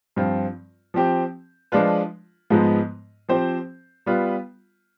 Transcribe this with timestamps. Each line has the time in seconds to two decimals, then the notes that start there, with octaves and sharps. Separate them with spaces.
0.16 G2 F3 C4 F4
0.94 F3 C4 G4
1.72 F3 G#3 D4 F4 B4
2.50 G#2 F3 G#3 B3
3.29 F3 C4 G4 C5
4.06 G3 B3 F4 B4